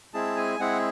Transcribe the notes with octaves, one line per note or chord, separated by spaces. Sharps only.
G#3 C4 E4 G#4 A5
G#5
G#3 C4 E4 G#4 F#5